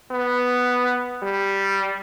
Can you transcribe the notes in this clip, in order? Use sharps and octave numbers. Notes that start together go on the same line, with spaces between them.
B3
G3